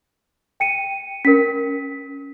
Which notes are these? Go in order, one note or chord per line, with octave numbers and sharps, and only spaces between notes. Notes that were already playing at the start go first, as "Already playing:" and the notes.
G5 C#7 D#7
C#4 A#4 B6